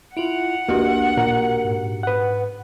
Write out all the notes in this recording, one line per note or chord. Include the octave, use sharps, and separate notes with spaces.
E4 F4 F#5 D7 F7 F#7
A#1 D#2 A#3 D4 F#4 G4
A#2 A#4
G#2
B4 F#5